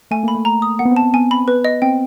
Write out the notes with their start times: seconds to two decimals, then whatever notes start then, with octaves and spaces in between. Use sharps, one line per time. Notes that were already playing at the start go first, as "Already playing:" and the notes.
0.11 A3 G#5
0.23 A#3 B5
0.35 A3
0.45 A#5
0.62 D#6
0.79 A#3 F#5
0.85 B3
0.91 C4
0.96 A5
1.03 B3
1.13 B3 G#5
1.31 B5
1.48 B4
1.64 D#5
1.82 C4 G5